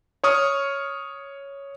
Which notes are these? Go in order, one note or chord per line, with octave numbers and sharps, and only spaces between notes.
C#5 C#6 D#6 F6